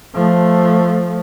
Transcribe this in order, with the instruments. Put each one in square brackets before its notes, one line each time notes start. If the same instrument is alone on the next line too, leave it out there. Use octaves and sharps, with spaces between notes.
[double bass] F3 A3